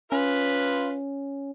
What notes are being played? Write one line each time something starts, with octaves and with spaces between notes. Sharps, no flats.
C#4 F4 B4